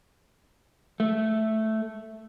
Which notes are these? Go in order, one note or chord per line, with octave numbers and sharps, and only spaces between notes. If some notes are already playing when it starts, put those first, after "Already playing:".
A3